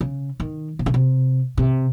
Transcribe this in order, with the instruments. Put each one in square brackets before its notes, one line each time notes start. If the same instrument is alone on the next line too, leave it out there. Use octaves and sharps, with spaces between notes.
[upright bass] C#3
D#3
C3
C#3
C3
C3